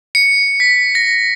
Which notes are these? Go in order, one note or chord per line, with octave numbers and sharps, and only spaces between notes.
C#7
B6
A#6